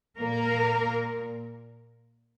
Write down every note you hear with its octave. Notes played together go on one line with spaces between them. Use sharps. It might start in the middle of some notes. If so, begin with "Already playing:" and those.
A#2 A#3 A#4
A#2
A#2